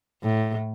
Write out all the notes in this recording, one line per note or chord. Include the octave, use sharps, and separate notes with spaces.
A2